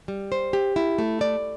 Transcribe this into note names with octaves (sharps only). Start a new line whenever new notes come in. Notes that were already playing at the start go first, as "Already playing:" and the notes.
G3
C5
G4
E4
A3
D5